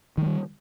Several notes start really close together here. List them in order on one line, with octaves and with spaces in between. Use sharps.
D#3 G#3 G3